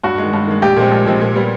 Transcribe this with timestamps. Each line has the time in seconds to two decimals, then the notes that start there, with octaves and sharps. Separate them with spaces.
0.03 G2 F#4
0.18 D#3 G#3
0.33 G2
0.47 D#3 G#3
0.62 A#1 G4
0.76 A#2 F3 G#3 C4
0.92 A#1
1.06 A#2 F3 G#3 C4
1.21 A#2
1.36 G3 B3